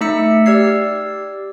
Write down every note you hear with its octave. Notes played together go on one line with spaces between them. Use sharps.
A3 D#4 E5 E6 C#7
G4 D5 E6 F6 G#6 C7